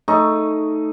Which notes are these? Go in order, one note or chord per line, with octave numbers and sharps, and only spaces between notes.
A3 D#4